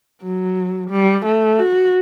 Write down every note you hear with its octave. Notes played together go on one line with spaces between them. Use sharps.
F#3
G3
A3
F#4